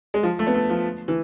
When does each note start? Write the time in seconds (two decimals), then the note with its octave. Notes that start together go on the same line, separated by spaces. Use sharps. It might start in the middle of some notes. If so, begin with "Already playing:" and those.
0.14 G#3
0.23 F3
0.39 A3
0.47 B3
0.54 A3
0.70 F3
1.08 E3